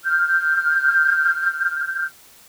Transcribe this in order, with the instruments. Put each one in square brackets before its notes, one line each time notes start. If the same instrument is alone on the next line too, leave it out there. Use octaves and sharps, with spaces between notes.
[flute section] F6 G6